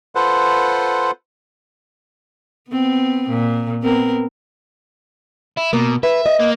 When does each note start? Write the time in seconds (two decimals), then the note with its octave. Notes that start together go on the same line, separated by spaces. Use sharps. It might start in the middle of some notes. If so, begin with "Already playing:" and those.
0.15 F4 A4 B4 C5 F#5
2.70 B3 C4
3.29 A#2
3.83 B3 C4 A#4
5.57 E4
5.73 B2 A#3
6.03 B4 E5
6.26 D#5
6.40 A#3